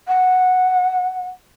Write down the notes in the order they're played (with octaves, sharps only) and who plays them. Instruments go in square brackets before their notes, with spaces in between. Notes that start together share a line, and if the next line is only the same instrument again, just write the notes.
[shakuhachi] F#5